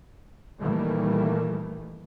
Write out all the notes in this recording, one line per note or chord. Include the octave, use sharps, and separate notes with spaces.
A#2 D#3 E3 G3 A3 A#3